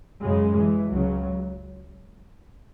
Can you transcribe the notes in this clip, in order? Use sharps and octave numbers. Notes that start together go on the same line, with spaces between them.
F#2 C#3 G#3
E3
C#2 C#3 F#3